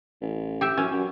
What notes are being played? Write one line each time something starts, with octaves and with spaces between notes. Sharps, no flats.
A1
G4 E5
F#2 C#4
F#2